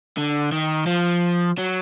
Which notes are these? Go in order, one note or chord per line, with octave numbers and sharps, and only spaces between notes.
D3
D#3
F3
F#3